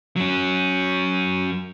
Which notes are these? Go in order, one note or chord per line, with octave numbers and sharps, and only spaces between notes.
F#3 C#4